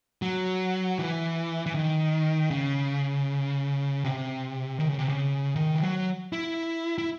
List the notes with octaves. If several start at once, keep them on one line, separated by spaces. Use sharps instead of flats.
F#3
E3
E3
D#3
C#3
C3
D#3
C#3
C3
C#3
D#3
E3
F#3
E4
E4